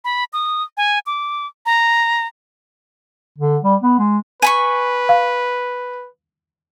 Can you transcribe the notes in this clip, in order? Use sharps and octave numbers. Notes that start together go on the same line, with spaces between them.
B5
D#6
G#5
D6
A#5
D3
G3
B3
G#3
B4 G#5 B5 C#6
F5